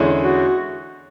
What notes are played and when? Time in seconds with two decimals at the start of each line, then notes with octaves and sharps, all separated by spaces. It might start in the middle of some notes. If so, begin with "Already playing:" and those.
Already playing: E2 D3 G#3 C#4 E4
0.22 F#4